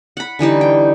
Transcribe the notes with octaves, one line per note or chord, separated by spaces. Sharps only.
F#5 B5
D3 E3 G3 D#4
G5